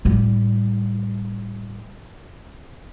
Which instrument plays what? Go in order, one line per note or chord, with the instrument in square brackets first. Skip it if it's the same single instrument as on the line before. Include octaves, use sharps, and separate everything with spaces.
[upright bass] A2 G3